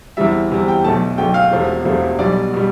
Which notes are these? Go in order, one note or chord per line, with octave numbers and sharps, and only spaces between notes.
E2 C3 E3 G3 E5
E2 C3 E3 G3
G5
B1 B2 A3 A5
B1 B2 A3 G5
F5
E1 E2 C3 F3 A3
E1 E2 C3 F3 A3
B1 B2 G3 D5
B2 G3